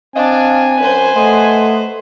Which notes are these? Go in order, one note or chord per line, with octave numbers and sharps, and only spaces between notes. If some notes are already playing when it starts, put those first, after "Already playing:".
C4 D4 D#5 F5 G#5
F#2 B4 C5
A3 D#5 F#5 C6